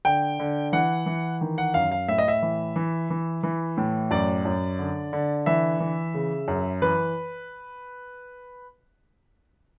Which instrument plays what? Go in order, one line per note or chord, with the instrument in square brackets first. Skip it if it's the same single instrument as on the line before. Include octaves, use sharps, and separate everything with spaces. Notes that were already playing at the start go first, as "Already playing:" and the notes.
[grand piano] D3 G5
D3
E3 F#5
E3
D#3
F#5
F#2 F5
F5
A2 E5
D#5
E5
E3
E3
E3
E3
A2
F#2 D5
F#2
D3
D3
E3 E5
E3
C#3
F#2
E3 B4